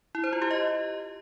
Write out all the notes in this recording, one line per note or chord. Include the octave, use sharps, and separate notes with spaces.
E4
C5
F4
G4
D#5